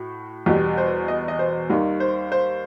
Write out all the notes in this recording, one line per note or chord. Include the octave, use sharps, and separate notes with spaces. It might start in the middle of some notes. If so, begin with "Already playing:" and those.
Already playing: A2 F#4
E2 B2 G3 G4
C5
D#5
D#5
C5
D#2 D#3 G3
C5
C5